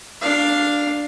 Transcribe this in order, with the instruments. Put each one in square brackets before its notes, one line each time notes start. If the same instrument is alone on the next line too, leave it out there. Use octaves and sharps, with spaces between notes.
[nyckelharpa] D4 F5